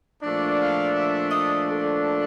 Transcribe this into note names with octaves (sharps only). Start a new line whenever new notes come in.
A#2 F3 A3 D4
F5
E5
D#5
A4